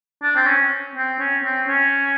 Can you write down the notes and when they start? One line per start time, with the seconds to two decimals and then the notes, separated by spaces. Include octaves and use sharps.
0.23 D4
0.36 C4
0.47 C#4
0.96 C4
1.20 C#4
1.44 C4
1.68 C#4